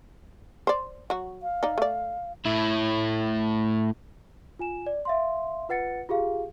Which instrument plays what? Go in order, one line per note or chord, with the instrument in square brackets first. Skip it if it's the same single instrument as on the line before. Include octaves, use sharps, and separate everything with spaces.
[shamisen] C5 D5
F#3 F#4
[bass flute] F5
[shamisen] D#4 D5
A3 D5
[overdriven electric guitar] A2 E4
[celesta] F4 G#5 E7
D5
E5 F5 C6
F4 B4 F#5 A6 C#7
F4 G4 G#4 F5